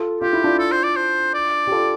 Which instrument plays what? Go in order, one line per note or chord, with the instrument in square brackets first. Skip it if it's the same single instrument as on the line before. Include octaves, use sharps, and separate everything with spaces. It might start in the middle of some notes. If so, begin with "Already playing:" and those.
Already playing: [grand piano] F4 A4
[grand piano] F4 [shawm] G4
[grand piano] E4
D4 F4
[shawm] A4
C5
D5
C5
D5
[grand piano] G4
F4 A4